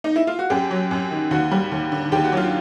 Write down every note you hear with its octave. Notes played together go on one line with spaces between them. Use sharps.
D#4
E4
F4
F#4
F#2 G4
F#3
F#2
D#3
D#2 F#4
G3
D#2
D3
D#2 G4
F#4
F#3 F4